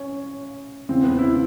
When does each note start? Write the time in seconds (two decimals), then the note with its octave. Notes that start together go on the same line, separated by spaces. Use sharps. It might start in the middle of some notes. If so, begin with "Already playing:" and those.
Already playing: C#4
0.89 E2 C#3 E3 C4
1.04 B3
1.19 E4